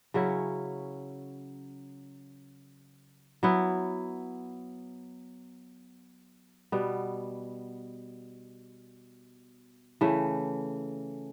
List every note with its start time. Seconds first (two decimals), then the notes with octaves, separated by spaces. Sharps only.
0.14 C#3 F#3 C#4 E4
3.43 F#3 B3 E4
6.72 B2 G3 B3
10.01 C#3 E3 A3